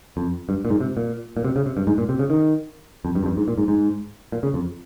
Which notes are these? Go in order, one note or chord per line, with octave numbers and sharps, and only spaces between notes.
F2
G2
A#2
G#2
C3
A#2
A#2
C3
C#3
C3
G2
G#2
A#2
C3
C#3
D#3
F2
G2
F2
G2
G#2
A#2
G#2
G#2
A#2
C#3
F2